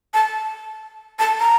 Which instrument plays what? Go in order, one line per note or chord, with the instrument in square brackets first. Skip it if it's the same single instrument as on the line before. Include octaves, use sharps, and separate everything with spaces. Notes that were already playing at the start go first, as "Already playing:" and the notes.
[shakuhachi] A5
A5
A#5